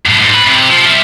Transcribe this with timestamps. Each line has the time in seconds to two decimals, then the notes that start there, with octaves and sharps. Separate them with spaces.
0.06 F#2 A2
0.19 G#2
0.34 B4
0.47 C3
0.69 F3
0.85 G3 E5